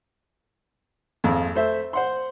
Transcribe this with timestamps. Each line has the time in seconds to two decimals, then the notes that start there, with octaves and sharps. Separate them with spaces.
1.24 G#1 F2
1.55 A3 C5 E5
1.93 C5 F#5 C6